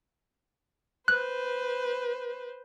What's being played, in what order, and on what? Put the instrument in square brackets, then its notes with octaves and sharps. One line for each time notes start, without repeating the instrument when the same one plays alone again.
[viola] B4 C5 [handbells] F#6